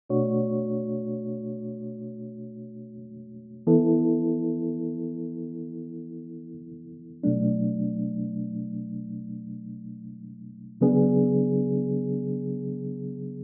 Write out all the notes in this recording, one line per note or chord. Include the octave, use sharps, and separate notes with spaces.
B2 A3 D4 F#4 C#5
E3 B3 E4 A4
B2 F#3 A3 D4
C#3 F#3 B3 D4 G#4